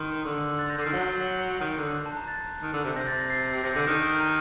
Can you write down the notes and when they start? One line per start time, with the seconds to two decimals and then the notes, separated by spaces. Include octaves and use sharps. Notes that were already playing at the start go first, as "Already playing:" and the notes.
Already playing: D#3 C6
0.25 D3
0.59 F#6 A6
0.70 G6 A#6
0.78 D3
0.81 D#3 A6 C7
0.93 F#3
1.02 G6
1.09 F#6 A6
1.27 G6
1.61 D#3
1.78 D3
1.95 F#6
2.06 A5
2.17 A#5
2.28 F#6 A6
2.62 D#3
2.73 D3
2.85 C3
2.96 C3 G6 A#6
3.07 A6
3.18 A#6
3.30 A6 C7
3.64 C3 G6 A#6
3.75 D3 G6 A#6
3.86 D#3 G6 A#6
4.09 F#6
4.20 A#5